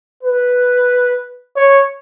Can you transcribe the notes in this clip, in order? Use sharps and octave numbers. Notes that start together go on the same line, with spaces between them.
B4
C#5